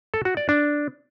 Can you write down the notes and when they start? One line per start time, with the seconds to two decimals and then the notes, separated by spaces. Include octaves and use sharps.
0.14 A4
0.25 F#4
0.37 D5
0.49 D4